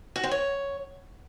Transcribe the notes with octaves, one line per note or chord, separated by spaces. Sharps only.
F#4
C4
C#5